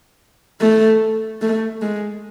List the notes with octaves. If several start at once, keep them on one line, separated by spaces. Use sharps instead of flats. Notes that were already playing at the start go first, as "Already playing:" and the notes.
A3
A3
G#3